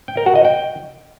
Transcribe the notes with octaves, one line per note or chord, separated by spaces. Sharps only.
G5
A#4
F#4
D#5
G5